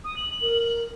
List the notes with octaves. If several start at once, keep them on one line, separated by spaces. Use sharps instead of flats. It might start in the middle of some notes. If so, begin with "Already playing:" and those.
D#6
F#7
A#4